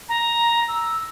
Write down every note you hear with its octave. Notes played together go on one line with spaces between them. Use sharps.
A#5
E6